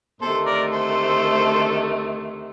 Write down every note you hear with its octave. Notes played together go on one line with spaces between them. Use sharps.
D2 C3 D#3 A3 A4 C5
A#4 D5
A4 C5